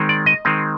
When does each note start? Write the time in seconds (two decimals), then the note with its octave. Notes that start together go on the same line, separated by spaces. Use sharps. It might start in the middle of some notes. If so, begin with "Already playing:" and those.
Already playing: D#3 G#3 C4
0.09 D5
0.26 D#5
0.45 D#3 G#3 C4